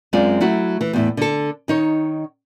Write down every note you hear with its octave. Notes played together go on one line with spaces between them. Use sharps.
F#2 G#3 C4 F4 D5
F#3 A3 E4 F#4
E3
E2 A2 E4
D3 A4
D#3 D#4 C#5